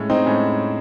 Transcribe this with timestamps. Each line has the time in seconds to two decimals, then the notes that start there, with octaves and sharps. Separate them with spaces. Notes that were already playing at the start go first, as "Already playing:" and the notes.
Already playing: A2 G#3 C#4
0.10 C4 D#4
0.26 A2 G#3 C#4